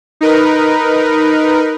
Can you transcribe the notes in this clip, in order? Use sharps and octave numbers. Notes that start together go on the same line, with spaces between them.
D#4 A#4 B4